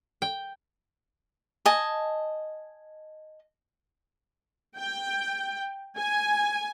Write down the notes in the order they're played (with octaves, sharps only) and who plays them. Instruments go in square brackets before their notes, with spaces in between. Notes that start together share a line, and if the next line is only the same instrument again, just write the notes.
[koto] G5
[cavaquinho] D#5 G#5 A5
[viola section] G5
G#5